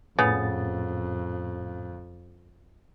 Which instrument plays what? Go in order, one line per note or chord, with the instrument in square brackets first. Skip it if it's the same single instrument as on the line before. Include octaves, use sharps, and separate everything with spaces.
[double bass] F2 [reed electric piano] A2 A6 [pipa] C#3 B3